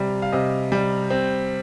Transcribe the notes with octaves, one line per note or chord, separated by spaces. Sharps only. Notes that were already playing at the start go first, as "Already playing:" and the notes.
Already playing: C3 G3
F5
C3 D#5
G3
C4